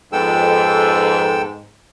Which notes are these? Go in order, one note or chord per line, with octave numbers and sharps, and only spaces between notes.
F2 G#2 B3 A4 G5 E6